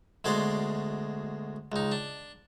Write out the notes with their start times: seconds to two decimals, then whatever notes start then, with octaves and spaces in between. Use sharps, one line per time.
0.24 D2 B2 G#3 G#4 D5 C6
1.72 C#2 D#4
1.92 D4